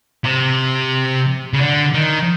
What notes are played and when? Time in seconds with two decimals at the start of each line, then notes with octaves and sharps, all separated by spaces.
0.24 C3
1.53 C#3
1.60 D3
1.94 D#3